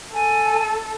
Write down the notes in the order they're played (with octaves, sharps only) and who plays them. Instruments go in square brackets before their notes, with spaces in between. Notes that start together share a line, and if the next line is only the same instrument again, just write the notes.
[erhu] A4 [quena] G#5